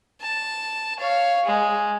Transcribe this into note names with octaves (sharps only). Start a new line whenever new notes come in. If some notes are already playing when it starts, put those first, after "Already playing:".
A5
C#5 F5
G#3